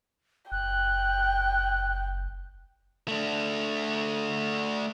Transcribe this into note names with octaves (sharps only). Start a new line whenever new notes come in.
F#1 G5 F#6
A3 D4